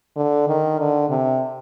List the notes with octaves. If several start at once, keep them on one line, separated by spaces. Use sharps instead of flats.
D3
D#3
D3
C3